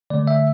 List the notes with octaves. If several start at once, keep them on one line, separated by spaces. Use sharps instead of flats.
D3 A3 D5
E5